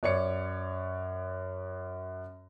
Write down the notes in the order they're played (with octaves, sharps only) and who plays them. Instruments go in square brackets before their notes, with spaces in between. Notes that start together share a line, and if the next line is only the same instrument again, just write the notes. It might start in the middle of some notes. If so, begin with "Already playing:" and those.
[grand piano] F#2 C#5 D5 C#7